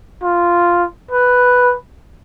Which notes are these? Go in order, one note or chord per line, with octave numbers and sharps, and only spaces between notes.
F4
B4